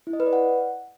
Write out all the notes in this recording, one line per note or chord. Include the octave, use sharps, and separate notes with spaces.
E4
D#5
B4
D5
F#5